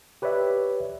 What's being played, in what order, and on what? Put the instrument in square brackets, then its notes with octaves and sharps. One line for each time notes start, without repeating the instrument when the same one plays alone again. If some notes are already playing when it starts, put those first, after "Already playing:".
[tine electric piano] G4 B4 C#5 D5 E5